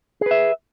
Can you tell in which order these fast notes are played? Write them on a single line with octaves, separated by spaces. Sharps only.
G#4 B4 E5